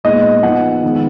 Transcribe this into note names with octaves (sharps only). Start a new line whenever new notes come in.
A#2 G#3 B3 D#4 D#5
F3 B3 D#4 F#5
D#3 G#3 B3 D#4